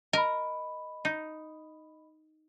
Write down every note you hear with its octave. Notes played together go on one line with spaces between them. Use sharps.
A#4 D#5 B5
D#4